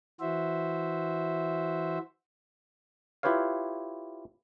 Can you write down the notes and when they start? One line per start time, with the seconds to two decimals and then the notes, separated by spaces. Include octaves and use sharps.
0.20 E3 F#4 C5 E5
3.23 E4 F4 G4 B4 C#5 F5